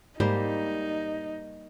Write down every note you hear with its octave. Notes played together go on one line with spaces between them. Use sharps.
G#2 G3 A#3 D#4 C5